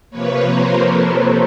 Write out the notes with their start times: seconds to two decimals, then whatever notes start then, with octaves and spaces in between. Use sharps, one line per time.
0.11 C3 F3 A#3 B4 C#5
0.48 A#4 C5
0.85 A4 B4